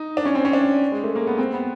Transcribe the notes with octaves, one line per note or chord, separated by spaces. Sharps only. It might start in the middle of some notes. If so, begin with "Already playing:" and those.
Already playing: D#4
D4
C#4
C4
C#4
D4
G#3
A3
A#3
B3
C4
B3